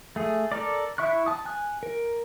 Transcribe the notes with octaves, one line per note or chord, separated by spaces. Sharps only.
A3 G#4
A4 A#4 D5
E4 E5 C#6 F#6
A5 D#6
G#5 F#6
A#4